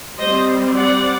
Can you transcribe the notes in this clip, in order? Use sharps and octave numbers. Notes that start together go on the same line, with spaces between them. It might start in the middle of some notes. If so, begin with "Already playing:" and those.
G3 C4 C5 D#5
D5 F#5